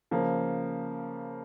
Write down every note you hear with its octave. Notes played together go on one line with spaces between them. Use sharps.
C#3 F3 A#3